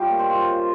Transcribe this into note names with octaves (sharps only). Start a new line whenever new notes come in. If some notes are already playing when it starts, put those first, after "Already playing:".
Already playing: G3 F4 C#5 F5 G5
A#3
C5 D#5
F4
C#3